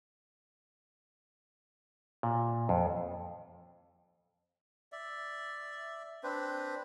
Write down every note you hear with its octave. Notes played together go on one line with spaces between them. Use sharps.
A#2
F2
D5 E5
C4 D4 B4 C5